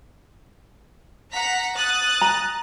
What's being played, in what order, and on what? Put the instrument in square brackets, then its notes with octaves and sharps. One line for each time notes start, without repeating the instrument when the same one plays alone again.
[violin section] F#5 A#5 B6
D#6 F#6 A6
[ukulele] A#5